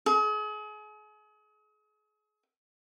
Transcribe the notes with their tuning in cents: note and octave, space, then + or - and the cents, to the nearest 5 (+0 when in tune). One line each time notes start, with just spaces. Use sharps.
G#4 +35